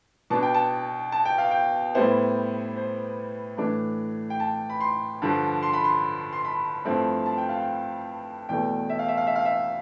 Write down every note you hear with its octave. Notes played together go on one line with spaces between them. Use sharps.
B2 B3 D4 A5
G5
A5
A5
G5
F5
G5
A2 G3 B3 E4 C5
C5
A2 E3 A3 D4
G5
A5
B5
C6
G2 D3 F3
C6
B5
C6
C6
B5
G2 F3 A3 C4 E4
A5
G5
F5
G5
E2 B2 A3 G5
E5
F5
E5
F5
E5
F5
E5